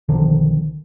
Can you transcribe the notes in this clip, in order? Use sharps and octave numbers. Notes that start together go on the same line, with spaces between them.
B1 D3 D#3 F3